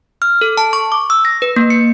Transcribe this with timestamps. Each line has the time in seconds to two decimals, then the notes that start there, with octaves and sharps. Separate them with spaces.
0.22 F6
0.41 A4
0.57 A5
0.73 C#6
0.92 D6
1.10 E6
1.25 A#6
1.42 B4
1.56 A#3
1.70 C#7